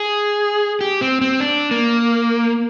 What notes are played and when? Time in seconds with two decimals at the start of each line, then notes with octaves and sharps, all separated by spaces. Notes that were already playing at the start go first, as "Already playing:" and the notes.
Already playing: G#4
0.81 G4
1.01 C4
1.21 C4
1.40 D4
1.71 A#3